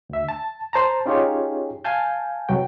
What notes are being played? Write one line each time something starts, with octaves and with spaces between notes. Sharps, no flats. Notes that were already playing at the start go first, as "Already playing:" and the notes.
D2 E5
A5
C5 A5 A#5
C#4 D#4 F4 G4 G#4 C#5
F5 G#5 A5 G6
C2 F#3 F#4 G5